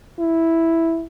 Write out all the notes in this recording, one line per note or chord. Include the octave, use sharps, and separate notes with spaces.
E4